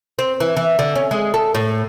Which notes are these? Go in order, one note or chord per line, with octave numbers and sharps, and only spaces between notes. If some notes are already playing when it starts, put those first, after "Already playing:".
C4
E3
E3
D3
C#4
G#3
A4
A2